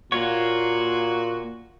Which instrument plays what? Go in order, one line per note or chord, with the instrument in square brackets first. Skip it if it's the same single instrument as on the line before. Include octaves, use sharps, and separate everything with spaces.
[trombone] A#2 [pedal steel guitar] A#3 F4 C#5 [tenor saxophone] F#4